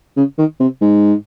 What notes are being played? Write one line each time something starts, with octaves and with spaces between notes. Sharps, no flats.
C#3
D#3
C3
G#2